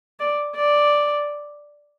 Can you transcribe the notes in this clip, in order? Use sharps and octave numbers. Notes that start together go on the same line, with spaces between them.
D5
D5